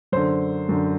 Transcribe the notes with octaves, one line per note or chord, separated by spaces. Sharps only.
F#2 D3 C5
F#2 D3